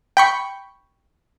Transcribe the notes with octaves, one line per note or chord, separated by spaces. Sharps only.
G5 B5 C#6